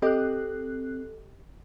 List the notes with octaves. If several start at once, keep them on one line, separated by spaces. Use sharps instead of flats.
C4 G4 A4 D#5 F#6